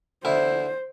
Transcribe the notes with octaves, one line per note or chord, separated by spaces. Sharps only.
D2 E4 C5